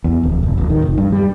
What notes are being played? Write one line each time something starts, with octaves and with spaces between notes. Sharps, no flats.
E2
D1
F1
D1
D#3
F1
G2
G3